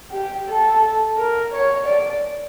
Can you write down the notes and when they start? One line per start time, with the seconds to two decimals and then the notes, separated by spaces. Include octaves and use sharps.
0.12 G4
0.48 A4
1.17 A#4
1.52 C#5
1.86 D5